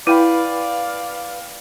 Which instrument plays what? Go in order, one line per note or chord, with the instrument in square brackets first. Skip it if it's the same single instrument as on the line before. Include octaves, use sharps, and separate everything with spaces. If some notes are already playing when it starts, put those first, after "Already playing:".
[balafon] E4 [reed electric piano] B4 G5 B5 [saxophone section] D5 F5